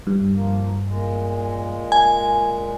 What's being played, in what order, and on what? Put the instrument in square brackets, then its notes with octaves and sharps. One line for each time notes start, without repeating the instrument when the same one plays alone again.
[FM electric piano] G2
[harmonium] F3 A#3
A#2 G#3
[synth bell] G#5